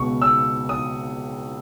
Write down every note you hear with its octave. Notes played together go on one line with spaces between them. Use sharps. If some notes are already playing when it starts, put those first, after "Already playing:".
Already playing: C#2 B2 C#6
E6
D#6